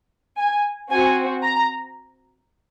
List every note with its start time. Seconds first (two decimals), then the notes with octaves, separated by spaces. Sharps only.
0.38 G#5
0.91 C4 F#4 G#5
1.44 A#5